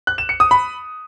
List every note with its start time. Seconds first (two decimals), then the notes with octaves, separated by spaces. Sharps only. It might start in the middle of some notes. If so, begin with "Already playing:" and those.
0.07 F#6
0.18 E7
0.29 C#7
0.40 D#6
0.51 B5